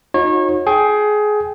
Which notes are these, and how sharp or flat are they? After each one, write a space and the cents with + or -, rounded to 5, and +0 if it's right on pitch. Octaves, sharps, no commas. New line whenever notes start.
D#4 +0 F#4 -40 C#5 -30
G#4 +20 G5 +0